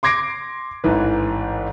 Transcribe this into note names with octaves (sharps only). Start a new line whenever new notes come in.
C6 D6 G#6 A#6 C7 D7
A1 G#2 E3 B4